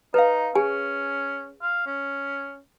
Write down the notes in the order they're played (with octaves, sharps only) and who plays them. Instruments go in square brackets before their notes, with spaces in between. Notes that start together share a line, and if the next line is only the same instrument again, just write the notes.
[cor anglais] D#4 [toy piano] B4 F5
[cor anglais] C#4 [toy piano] G#4 G#5
[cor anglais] F5
C#4